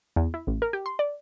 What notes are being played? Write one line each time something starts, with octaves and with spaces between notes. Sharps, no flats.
E2
E4
A1
A#4
G4
C6
D5